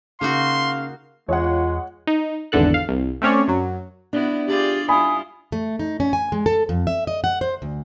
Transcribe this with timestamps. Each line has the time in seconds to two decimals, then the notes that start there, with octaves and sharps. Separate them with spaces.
0.21 C#3 A#3 D#4 F#4 F5 C6
1.29 E2 G#3 F4 C#5 F#5
2.07 D#4
2.52 G#1 E2 D3 A4 F#6
2.74 F5
2.89 C2
3.22 A3 C4 C#4 C#5 D5
3.48 F#2 F#3
4.13 B3 D4 E4 F#4
4.47 F4 G4 G#4 D5
4.89 G3 E4 F4 G#5 B5 D#6
5.52 A3
5.79 D#4
6.00 C#4
6.13 G#5
6.32 G#3
6.46 A4
6.69 F2
6.87 E5
7.07 D#5
7.24 F#5
7.41 C5
7.62 D2